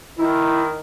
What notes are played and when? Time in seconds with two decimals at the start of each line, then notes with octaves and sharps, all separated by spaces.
0.18 D#3 E4